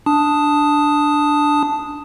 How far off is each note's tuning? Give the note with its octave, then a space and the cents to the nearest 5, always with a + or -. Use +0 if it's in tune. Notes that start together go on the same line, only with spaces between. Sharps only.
D4 +0 A5 +0 D#6 +0